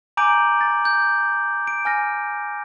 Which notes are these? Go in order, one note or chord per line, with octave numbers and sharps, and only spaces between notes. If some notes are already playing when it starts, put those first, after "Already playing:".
G#5 A#5 D6 G6 D7 F#7
A6
G6
D7
G#5 F6 A#6